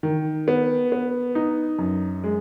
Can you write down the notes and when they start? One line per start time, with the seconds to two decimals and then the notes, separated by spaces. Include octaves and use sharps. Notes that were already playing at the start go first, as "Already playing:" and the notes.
0.03 D#3
0.48 B3
0.92 B3
1.35 D#4
1.79 F#2
2.24 G#3